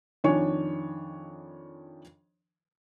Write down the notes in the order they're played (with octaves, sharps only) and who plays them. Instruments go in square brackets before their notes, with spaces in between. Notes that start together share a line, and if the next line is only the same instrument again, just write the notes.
[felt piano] F2 D#3 D4 C#5 G#5 C#6